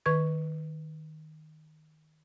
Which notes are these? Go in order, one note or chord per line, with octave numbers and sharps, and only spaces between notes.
D#3 B4 C#6 G#6